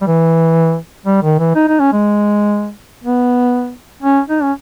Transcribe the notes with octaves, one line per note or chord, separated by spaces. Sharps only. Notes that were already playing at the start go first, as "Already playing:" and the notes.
G3
E3
G3
D#3
E3
D#4
D#4
C#4
G#3
B3
C#4
D#4
C#4